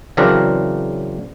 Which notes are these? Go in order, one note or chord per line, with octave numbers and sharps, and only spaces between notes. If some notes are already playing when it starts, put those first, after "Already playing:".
C#3 E3 F#3 C4 D4 A#4